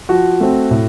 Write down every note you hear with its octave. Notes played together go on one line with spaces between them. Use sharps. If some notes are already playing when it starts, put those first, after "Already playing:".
F3 F#4
A3 C4
A2